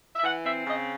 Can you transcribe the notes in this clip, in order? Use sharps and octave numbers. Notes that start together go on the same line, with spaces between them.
E5
E3 F#5
C4 E5
C#3 D#5